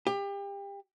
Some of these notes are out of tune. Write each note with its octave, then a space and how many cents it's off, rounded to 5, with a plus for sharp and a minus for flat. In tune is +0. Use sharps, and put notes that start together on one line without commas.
G4 +30